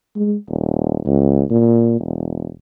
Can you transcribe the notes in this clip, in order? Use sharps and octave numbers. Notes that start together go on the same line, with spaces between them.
G#3
D#1
C#2
A#2
E1